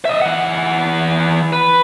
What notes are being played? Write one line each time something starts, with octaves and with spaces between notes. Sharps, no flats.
D#5 E5
E3 F#5
B4